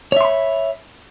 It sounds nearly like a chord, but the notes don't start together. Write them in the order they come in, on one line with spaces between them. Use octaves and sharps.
C#5 E5 C6 B5